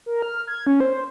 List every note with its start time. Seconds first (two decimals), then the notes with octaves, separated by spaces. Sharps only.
0.06 A#4
0.22 F6
0.48 G#6
0.67 C#4
0.80 C5